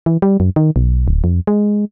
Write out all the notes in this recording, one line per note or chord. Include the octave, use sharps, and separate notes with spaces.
E3
G3
F#2
D#3
B1
D1
F2
G#3